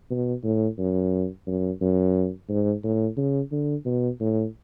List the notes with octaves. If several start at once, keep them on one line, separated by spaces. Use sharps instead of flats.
B2
A2
F#2
F#2
F#2
G#2
A2
C#3
D3
B2
A2